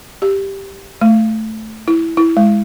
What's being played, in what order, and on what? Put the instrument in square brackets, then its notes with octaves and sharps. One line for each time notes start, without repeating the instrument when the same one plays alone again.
[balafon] G4
A3
E4
E4
G#3